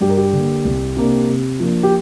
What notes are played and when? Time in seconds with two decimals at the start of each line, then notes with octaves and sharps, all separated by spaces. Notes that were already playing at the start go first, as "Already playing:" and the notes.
0.01 G2 G4
0.09 A#4
0.17 G4
0.33 D3 A#3
0.65 C2
0.97 C3 A#3 D4
1.29 C3
1.60 F3 A#3 D4
1.83 G4